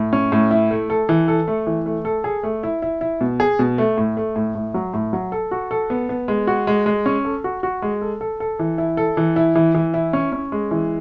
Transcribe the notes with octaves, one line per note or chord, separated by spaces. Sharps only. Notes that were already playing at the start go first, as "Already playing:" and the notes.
Already playing: A2
C#4
A2
E4
A3
A4
E3
A4
A3
E3
A3
A4
G#4
A3
E4
E4
E4
B2
G#4
B2
A3
A2
A3
A2
A2
F#3
A2
F#3
A4
F#4
A4
B3
B3
G#3
F#4
G#3
G#3
C#4
A4
F#4
F#4
G#3
A4
A4
A4
E3
E4
A4
E3
E4
E3
E3
E4
C#4
C#4
G#3
E3